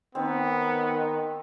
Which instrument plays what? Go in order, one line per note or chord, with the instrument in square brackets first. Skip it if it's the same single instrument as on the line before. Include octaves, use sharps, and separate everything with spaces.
[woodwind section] D#3 [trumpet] B3 [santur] C4